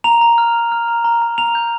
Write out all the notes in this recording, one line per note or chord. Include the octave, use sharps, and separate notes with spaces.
A#5 F7
A#5
F6
F6
F6
A#5
A#5
A#5
A#5 F7
G6